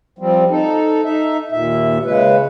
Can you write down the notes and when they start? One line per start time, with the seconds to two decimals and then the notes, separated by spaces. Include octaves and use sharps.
0.19 F3 G3 C4
0.50 D#4 A4
1.05 D#4 E5
1.52 D#2 A#2 E5
2.05 C#3 G#3 B4